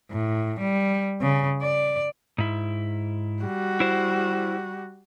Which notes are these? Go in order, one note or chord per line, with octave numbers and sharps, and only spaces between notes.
A2
G3
C#3
D5
G#2 E4
G3 F#4
E4 C5